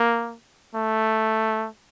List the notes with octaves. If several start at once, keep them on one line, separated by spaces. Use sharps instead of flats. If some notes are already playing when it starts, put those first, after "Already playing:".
Already playing: A#3
A3